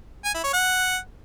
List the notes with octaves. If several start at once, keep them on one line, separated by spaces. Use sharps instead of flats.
G#5
E4
C#5
F#5